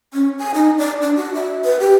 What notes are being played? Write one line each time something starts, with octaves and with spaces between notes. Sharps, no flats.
C#4
G#5
D#4
D5
D4
F#4
E5
B4
G4